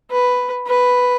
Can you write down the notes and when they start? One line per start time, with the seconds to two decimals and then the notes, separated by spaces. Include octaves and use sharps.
0.11 B4
0.67 B4